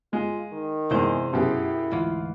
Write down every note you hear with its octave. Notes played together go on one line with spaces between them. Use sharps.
G#3 F4
D#3
E2 C3 G#3 C5
F#2 B2 E4 G4 G#4
D2 G#2 E3 F4